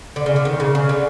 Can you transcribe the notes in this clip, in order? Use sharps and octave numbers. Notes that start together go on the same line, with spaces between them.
D3
C#3
D3
D#3
C#3
C#3
D3